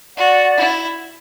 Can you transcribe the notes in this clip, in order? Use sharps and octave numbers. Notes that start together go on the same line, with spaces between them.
F#4 D5 F#5
E4